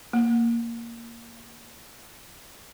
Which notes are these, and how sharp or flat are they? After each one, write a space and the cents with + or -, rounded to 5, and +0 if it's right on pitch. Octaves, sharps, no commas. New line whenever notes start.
A#3 -5